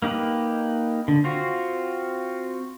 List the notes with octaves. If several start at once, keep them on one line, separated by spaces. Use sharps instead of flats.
A#3 D#4 G4 B4
D3
C4 F4 F#4